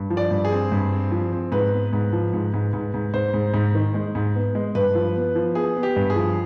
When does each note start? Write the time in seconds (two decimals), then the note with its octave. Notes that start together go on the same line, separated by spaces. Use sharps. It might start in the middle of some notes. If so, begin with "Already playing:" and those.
Already playing: G2
0.10 F3
0.17 D5
0.31 G2
0.45 G#4
0.52 C4
0.72 G2
0.92 C4
1.12 F3
1.33 C4
1.52 G#2 B4
1.72 B3
1.93 G#2
2.13 F3
2.34 G#2
2.54 G#2
2.73 G#2
2.94 G#2
3.14 G#2 C5
3.34 G#2
3.54 G#2
3.75 D#3
3.94 G#3
4.15 G#2
4.35 B3
4.55 G#3
4.75 G2 B4
4.95 F3
5.16 B3
5.35 F3
5.55 B3 G#4
5.77 B3
5.83 G4
5.96 G2
6.10 G#4
6.16 F3